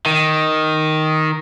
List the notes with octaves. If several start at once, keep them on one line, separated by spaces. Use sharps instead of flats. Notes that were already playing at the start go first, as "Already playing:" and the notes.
D#3